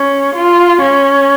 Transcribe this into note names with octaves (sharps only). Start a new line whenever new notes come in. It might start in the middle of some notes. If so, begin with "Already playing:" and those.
Already playing: C#4
F4
C#4